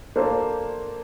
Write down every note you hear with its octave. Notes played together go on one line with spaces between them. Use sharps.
A#3 D4 A4 C5